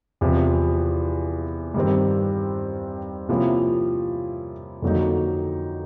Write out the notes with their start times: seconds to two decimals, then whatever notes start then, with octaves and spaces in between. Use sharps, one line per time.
0.21 E2 C3 F3
1.74 G2 D#3 G3 C4
3.29 C3 F3 A#3 C#4 E4
4.82 F2 D3 F#3 A#3 D#4